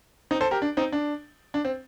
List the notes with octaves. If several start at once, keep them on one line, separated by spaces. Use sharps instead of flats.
C4 D#4
A4 C5
G4 A#4
D4
C4 D#4
D4
D4
C4